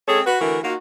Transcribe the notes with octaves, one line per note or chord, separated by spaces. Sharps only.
G#3 C4 C#4 G#4 A4 C#5
F#4 B4
D3 E3 A3 F#4 A#4
A#3 D#4 F4 F#4